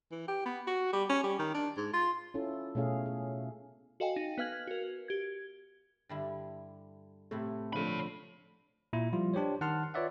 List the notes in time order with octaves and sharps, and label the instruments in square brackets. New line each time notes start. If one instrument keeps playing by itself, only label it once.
[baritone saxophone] E3
G4
B3
F#4
G3
C#4
G3
D#3
D4
G#2
F4
[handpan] C#4 E4 F4 A4
B2 A3 C#4 G#4 F5
G#4
[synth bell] F#4 A4 D#5 F5 G5 G#5
D#4
B3 B4 F5 F6 G#6 F#7
F#4 A#4
G4 G#6
[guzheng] G2 D3 E4
[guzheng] A2 C3 E4 [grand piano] A3
[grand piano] D3 F3 A3 [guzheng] B4 [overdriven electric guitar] C#5 B5
[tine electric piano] A#2 E4
F3 G3 E4 F4
D4 G4 C5 C#5
D#3 F#5 A5 C6 F6
F4 B4 C#5 D5 E5 F#5